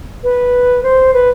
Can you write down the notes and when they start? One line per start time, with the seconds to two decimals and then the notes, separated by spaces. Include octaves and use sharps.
0.23 B4
0.83 C5
1.14 B4